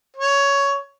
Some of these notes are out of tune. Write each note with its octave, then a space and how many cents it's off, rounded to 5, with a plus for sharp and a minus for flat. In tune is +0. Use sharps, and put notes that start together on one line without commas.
C#5 +10